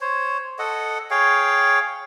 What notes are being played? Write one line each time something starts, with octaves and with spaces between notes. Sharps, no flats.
C5 C#5
A4 D#5 F#5
G#4 C#5 F5 G5